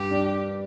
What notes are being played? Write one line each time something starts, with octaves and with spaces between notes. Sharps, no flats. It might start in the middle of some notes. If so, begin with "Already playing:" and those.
Already playing: G2 G4
D4